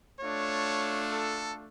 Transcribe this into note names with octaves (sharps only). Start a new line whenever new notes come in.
A3 D4 F4 C#5
A4